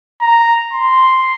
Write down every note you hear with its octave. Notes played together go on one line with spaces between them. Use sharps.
A#5
C6